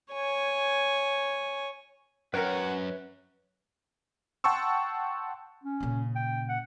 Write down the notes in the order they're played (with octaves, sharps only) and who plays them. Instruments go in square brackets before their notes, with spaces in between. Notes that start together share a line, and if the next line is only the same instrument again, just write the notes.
[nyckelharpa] C#5 G#5
[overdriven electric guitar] F#2 [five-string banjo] A#4 G5 [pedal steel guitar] B4 C#5 A#5 [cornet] F#5
[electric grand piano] F#5 G5 A5 C6 C#6 E6
[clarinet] C#4
[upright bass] A#2 C#3
[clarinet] G5
F#5